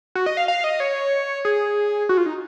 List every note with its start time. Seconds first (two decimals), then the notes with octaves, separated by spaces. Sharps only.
0.15 F#4
0.26 D#5
0.37 F5
0.48 F5
0.64 D#5
0.80 C#5
1.45 G#4
2.09 F#4
2.18 F4
2.26 D#4